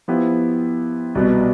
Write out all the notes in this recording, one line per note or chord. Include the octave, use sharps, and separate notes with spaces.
F3 B3 E4 G4
C2 B2 B3